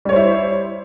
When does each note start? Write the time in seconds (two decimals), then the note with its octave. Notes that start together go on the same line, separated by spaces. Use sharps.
0.05 G3
0.09 C#5
0.13 C5
0.16 E4